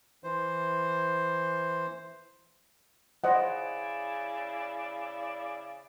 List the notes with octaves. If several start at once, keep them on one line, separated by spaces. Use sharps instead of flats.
E3 C5
C#3 E4 C5 D5 D#5 F#5